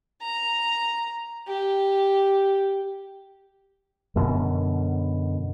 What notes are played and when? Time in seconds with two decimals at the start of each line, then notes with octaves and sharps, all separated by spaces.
0.22 A#5
1.48 G4
4.16 F#2 B2 D3